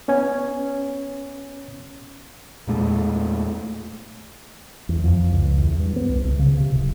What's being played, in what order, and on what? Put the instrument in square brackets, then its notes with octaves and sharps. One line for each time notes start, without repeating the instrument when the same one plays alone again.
[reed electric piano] B3 C#4 C#5 G#5
[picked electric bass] E2 A#2 G#3 A3
[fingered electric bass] E2
F2
C#2
E2
G2
B3
C2
C#2
C#3
C3
D1